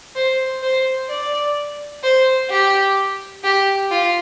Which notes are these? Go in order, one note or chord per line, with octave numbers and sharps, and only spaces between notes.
C5
C5
D5
C5
G4
G4
F4